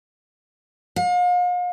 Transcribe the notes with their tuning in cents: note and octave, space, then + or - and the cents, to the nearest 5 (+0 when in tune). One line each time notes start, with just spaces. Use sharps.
F5 +40